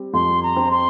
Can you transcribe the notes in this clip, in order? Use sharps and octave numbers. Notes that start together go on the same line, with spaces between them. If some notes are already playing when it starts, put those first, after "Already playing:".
Already playing: G3 C4
F2 C6
A#5
C4
C6